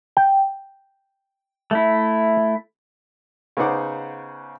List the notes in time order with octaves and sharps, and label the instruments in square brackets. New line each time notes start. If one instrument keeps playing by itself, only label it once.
[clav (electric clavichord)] G5
[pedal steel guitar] A3 E4
[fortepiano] C#3 B3 D#4 C5 F#5 D6